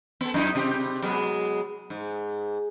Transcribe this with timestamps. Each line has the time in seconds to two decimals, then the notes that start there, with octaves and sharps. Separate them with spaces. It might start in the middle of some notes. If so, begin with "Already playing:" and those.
0.21 B3 A4
0.34 F#2 D#4 E4
0.55 C3 C4 G4
1.02 F#3 G#3 B3
1.90 G#2